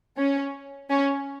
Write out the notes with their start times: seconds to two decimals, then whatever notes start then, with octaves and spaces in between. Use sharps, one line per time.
0.17 C#4
0.90 C#4